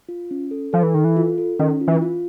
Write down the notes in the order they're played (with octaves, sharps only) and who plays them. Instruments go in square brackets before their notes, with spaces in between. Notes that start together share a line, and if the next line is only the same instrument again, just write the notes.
[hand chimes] F4
C#4
A4
[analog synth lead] F3 [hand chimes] A4
[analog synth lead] E3
[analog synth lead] D#3 [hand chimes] A4
[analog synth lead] E3
[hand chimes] F4
A4
[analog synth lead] D#3 [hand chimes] C#4
[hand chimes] F4
[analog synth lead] E3
[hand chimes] F4